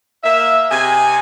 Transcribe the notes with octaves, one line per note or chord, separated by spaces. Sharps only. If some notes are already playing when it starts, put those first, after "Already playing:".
A#3 E5
C3 D#5 G#5